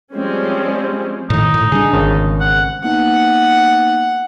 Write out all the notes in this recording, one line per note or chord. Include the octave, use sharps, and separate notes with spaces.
F3 G3 G#3 C4 C#4
A2 D#3 D#4
A2
D3 G3 D4 G#4
G#1 C#3 A5
F#5
A#3 B3 D#4 F#5